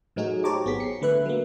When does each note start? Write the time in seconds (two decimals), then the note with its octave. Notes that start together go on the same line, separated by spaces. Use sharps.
0.16 A2 F#3 A3 D#4 F#4 G#4
0.44 G4 C5 C#5 A5 A#5 D6
0.65 G#1 B3 G#4 B6
0.80 C7 C#7
1.01 D3 A3 B4 E5 F#6
1.25 F#3 A#3